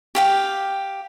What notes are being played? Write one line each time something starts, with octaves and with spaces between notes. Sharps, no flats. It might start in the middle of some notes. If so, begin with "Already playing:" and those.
G4 F5 G5